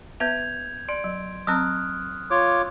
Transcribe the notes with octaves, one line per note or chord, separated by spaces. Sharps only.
B3 B4 E5 G6 G#6 F7
D5 C6 D7
F#3
F#3 C4 A#5 D#6 F6 F#6
F4 C#5 D6